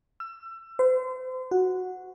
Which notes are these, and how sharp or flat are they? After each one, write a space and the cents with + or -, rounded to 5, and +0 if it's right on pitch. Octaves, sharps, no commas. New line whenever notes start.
E6 +30
C5 -35
F#4 -5